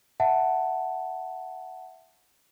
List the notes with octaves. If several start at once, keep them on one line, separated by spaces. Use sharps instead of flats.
E5 F#5 A5